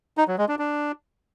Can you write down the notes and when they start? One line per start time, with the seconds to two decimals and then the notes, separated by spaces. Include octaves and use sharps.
0.18 D#4
0.28 F#3
0.38 G#3
0.48 D4
0.59 D4